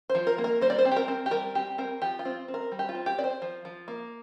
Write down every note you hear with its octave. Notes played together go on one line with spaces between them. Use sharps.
C5
F3
A#4
A#3
A#4
G3 C5
D5
C5
C4
G4
A#4
C4
G4
G3 A#4
C4 G4
C4 A#4
F3 G4
F4
C4
C4
A#4
G3
G4
F4
C4
G4
C4 D5
C5
F3
F3
A#3